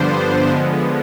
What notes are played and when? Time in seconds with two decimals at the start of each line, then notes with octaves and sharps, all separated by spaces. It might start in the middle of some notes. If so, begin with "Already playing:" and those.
Already playing: G2 D3 F3 B3 D4 C5
0.50 D3 F3 G#3 B3